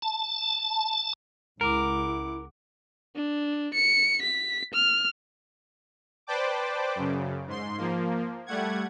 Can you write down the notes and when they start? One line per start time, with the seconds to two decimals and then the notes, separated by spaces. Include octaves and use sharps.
0.02 A5
1.61 C#2 E4 A#4 F#5 D6
3.16 D4
3.74 C#7
4.22 B6
4.74 F6
6.27 B4 C5 D5 G5 A5 D6
6.95 F#2 C#3
7.47 G#2 C6
7.78 F3 A#3
8.46 G3 A3 F#5 G#6